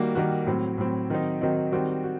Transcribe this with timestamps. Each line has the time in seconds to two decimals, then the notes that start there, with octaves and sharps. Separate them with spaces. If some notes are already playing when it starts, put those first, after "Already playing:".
Already playing: D#3 G3 A#3 F#4
0.15 D#3 G3 A#3 F#4
0.47 A2 F#3 C4
0.78 A2 F#3 C4
1.10 D#3 F#3 C4 D#4
1.41 D#3 F#3 C4 D#4
1.72 D#3 G3 C4 F#4
2.04 F#4